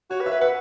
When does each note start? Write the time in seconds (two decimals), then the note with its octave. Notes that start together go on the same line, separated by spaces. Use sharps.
0.10 F#4 C#5
0.21 B4
0.26 E5
0.31 B4
0.41 B4 F#5